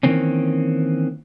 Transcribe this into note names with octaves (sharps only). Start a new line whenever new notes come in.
D#3 E3 A#3 C4 C#4